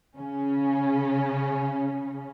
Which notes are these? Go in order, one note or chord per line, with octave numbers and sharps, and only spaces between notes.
C#3 C#4